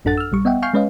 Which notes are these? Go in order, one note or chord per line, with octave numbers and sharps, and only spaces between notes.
A1 F#2 D4 A4 F#5 A6
E6 F6
A#1 G3 C#6
B3 D#5 E5 F#5 G5
F5 G#5 C#6 F6 G6 C7
G#3 C#4 B4 C#5 D#5 F5